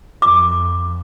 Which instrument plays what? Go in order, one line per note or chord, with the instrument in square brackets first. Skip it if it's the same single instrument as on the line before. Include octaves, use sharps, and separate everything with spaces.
[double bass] F2 [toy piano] D6